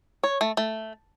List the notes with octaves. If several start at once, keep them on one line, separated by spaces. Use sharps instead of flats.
C#5
A3
A3